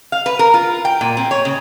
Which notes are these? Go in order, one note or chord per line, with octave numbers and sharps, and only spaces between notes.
F5
B4
A#4
F4
G5
A#2
C4
C#5
C#3